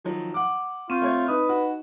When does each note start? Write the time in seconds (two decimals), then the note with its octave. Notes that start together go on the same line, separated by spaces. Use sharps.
0.04 D#3 F3 F#3
0.34 F#5 D6
0.90 C4 F4 C#6 G6 D#7
1.02 A3 C#5 G#6
1.28 D#4 B4 D#5 D#6
1.49 F#4